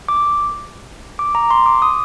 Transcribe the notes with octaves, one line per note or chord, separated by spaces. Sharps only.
D6
D6
A#5
C6
D6
D#6